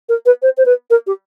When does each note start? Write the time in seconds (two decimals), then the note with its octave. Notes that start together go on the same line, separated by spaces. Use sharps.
0.09 A#4
0.26 B4
0.42 C5
0.57 C5
0.66 B4
0.90 A#4
1.07 G4